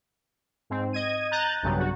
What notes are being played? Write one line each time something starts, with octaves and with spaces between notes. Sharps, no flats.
G#2 C4
D#5 G#6 D#7
A#5 F#6 G6 A6
B1 G2 C#3 F#3
F#4